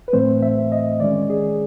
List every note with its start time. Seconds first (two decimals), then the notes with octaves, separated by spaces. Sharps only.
0.08 B4
0.13 A2 E3 A3 C4 C5
0.42 E5
0.72 D#5
1.00 D#3 G#3 C#4 D5
1.30 G#4